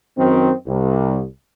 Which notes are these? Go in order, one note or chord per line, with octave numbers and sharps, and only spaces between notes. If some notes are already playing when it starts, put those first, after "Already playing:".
F#2 D#3 C4
C2